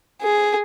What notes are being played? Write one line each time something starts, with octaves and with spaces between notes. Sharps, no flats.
G#4